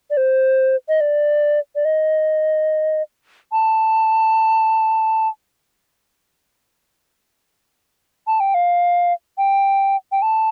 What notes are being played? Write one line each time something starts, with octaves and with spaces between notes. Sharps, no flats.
D5
C5
D#5
D5
D5
D#5
A5
A5
G5
F5
G5
G5
A5